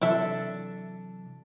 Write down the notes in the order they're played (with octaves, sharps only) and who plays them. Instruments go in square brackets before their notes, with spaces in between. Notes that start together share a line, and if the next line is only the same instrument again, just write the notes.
[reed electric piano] C3 E3 F#3 [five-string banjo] D4 A4 E5